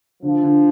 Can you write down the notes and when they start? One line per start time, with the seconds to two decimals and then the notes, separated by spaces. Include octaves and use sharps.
0.22 D3 F3
0.42 D3